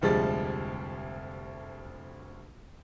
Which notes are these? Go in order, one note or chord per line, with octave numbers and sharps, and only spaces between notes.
F1 D2 F3 G3 G#3 A6